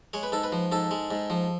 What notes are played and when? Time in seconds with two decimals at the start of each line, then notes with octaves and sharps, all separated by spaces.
0.13 G#3 C#5
0.23 B4
0.32 G#2 A4
0.44 B4
0.52 F3
0.72 G#2 A4
0.91 G#3
1.11 G#2
1.30 F3